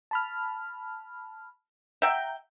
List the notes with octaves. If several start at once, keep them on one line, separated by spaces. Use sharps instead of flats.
A5 B5 F6
E5 F#5 G5 A#5 G6